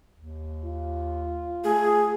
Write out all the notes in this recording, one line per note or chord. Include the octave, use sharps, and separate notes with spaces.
D#2
F4
A3 G#4